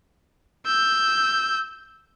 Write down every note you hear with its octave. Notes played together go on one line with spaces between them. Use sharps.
E6 G6